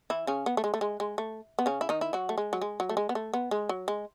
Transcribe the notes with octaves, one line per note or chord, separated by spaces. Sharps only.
E3 E4
C#3 C#4
B3
A3
G#3
A3
G#3
G#3
A3
B3
C#3 C#4
E4
D#3 D#4
E4
F#3 F#4
A3
G#3
F#3
G#3
F#3
A3
G#3
B3
A3
B3
G#3
F#3
G#3